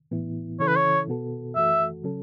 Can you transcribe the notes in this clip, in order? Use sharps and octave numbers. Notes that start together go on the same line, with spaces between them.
A2 E3 B3 E4
C#3 E3 C#4 E4 A4 C#5
B4
C#5
B2 B3 F#4 A4
F#2 E3 A3 F#4 A4 E5
C#3 F#3 C#4 A4